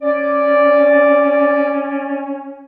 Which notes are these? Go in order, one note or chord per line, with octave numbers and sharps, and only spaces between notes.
C#4 D5